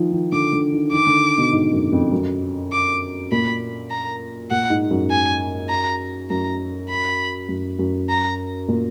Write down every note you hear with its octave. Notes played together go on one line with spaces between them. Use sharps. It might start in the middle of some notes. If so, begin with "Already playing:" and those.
Already playing: D#3 F3
D#3
D3 D6
D3
D#3
D#3 D6
D3
B2
G#2
F#2
F2
F#2
D6
A#2 B5
A#5
A#2 F#5
G#2
F#2
G#5
A#5
F#2 A#5
B5
F#2
F#2
A#5
A#2